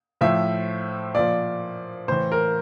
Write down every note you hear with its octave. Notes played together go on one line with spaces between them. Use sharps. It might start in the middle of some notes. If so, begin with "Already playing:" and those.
A2 F3 E5
A#2 F3 D5
A2 E3 C5
A#4